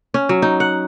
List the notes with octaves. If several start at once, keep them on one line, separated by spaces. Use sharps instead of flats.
C#4
F#3
D#4
F#5